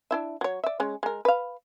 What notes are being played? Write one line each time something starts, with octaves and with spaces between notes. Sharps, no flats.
D4 E4 E5
F#3 C#5
D5 E5
G#3 C#4
G#3 A#4
B4 F5